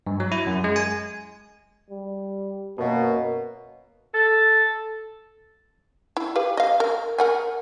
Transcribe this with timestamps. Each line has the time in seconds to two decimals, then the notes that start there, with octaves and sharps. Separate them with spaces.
0.07 G2
0.20 F#3
0.32 E4
0.47 F#2
0.64 G#3
0.76 G#5
1.90 G3
2.79 F#2 B2 A#3
4.14 A4
6.17 E4
6.36 G4 B4 F5
6.57 D#5 F5
6.80 A#4
7.18 A#4 F#5 G#5